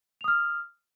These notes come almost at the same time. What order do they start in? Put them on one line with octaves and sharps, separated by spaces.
F7 D#6 F6